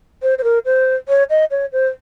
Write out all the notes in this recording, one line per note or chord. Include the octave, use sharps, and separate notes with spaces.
C5
C5
A#4
C5
C#5
D#5
C#5
C5